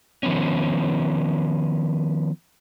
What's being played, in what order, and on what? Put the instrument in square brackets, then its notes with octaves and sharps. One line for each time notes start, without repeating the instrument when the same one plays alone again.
[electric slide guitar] D#3 F3 B3 C#4